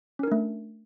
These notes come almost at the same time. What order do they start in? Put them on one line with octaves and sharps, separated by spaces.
C#4 A#4 D4 A3